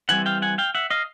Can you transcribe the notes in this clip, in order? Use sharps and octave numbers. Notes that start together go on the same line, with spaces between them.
E3 G3 C4 F#5 G#5
F5 G5
F#5 G#5
F5 G5
E5 F#5
D#5 F5